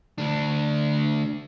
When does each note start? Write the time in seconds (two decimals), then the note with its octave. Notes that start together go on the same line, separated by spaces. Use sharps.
0.18 D2 D4